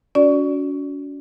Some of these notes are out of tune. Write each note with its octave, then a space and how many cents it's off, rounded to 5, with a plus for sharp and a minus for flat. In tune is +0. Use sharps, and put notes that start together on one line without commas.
C#4 +40 F#4 -10 D5 +0